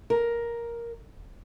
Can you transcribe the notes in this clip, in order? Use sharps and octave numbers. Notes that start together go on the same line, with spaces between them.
A#4